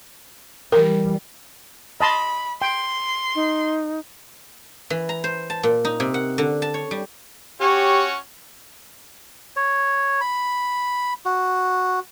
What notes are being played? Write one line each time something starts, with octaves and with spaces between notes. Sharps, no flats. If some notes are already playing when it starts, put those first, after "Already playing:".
E3 G3 A#4
D#5 A5 B5 C6
G5 C6
D#4
E3
A#5
C5
A5
A#2
D#4
C3
F#5
D3
A5
C#5
G3
C#4 F#4 G4 C#5
C#5
B5
F#4